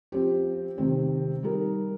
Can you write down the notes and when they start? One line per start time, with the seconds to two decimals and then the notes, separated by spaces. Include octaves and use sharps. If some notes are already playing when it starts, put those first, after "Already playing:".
0.12 F3 C4 G4
0.78 C3 D#3 C4
1.43 G3 D#4 A#4